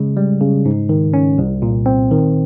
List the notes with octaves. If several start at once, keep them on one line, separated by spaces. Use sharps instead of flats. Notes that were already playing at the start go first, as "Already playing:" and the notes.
Already playing: C#3 G#3
G3
C#3
G#2
D#3
C#4
C2
A#2
C4
D#3